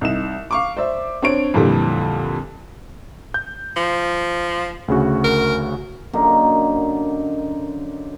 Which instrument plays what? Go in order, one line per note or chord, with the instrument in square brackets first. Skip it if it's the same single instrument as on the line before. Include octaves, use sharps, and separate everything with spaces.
[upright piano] C2 D#4 E7
F5 C#6 D6
C5 D5 E5
C4 D4 C#5 D7
F2 A#2 D3 E3 G3
[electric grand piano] G6
[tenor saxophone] F3
[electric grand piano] D2 C#3 F#4
[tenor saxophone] A#4
[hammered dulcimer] F#2 D3 A#3 D#4